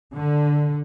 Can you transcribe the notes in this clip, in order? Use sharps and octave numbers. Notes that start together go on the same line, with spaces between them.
D3